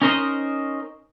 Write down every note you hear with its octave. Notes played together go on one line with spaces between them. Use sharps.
C#4 D#4 A#4 C5 D#5